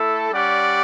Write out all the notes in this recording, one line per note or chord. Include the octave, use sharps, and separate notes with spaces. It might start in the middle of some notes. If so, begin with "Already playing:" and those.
Already playing: A3 E4 A4
G3 C#4 G4 D5 F#5